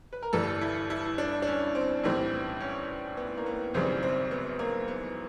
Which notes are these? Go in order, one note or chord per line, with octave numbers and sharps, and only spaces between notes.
B4
A#4
G1 G2 E3 G3 A4
E4
E4
D4
D4
C#4
C4
B1 A2 E3 G3 C4
C#4
B3
A#3
B3
G#1 F#2 C#3 E3 G3 C4
C4
B3
A#3
B3